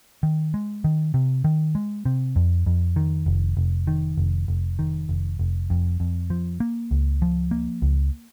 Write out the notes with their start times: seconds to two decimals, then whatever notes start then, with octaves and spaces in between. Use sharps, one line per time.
0.23 D#3
0.54 G#3
0.84 D#3
1.14 C3
1.44 D#3
1.75 G#3
2.05 C3
2.36 F2
2.66 F2
2.96 D#3
3.26 F1
3.57 F1
3.87 D#3
4.17 F1
4.48 F1
4.79 D#3
5.09 F1
5.39 F1
5.70 F2
6.00 F2
6.30 F3
6.60 A#3
6.91 C#2
7.22 F3
7.51 A#3
7.82 C#2